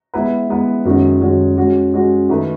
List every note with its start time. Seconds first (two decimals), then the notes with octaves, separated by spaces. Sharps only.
0.14 G#3 B3 E4 B4
0.50 G#3 B3 E4 B4
0.85 F#2 D#3 G#3 C#4 F#4
1.21 F#2 D#3 G#3 C#4 F#4
1.57 G#3 C#4 F#4
1.94 G#3 C#4 F#4
2.29 D#3 A3 E4 B4